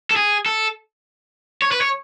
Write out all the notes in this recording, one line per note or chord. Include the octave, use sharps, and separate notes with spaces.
A4
G#4
A4
C#5
B4
C#5